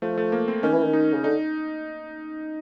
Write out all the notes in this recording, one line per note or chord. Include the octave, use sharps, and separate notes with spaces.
F3 A3
A3
A#3
C4
D#3 C#4
E3
D#3
D#4
C#3
D3 D#4